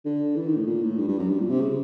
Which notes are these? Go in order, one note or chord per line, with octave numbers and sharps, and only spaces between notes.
D3
E3
D#3
A2
A#2
A2
G2
G2
F#2
G2
A#2
C3
C#3